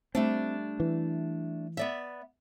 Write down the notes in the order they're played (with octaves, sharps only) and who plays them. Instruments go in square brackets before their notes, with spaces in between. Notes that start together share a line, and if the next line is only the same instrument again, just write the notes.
[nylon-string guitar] G3 A3 D4 [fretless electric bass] C4
[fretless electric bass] E3
[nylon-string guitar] B3 D5 E5